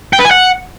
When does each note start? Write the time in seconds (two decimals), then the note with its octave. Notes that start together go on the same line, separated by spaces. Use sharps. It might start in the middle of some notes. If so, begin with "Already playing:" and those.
0.13 G5
0.19 B4
0.25 G#5
0.31 F#5